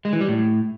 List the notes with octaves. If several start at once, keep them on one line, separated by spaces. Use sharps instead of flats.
G#3
E3
G3
A2